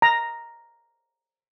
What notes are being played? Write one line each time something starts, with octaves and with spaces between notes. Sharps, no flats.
A#5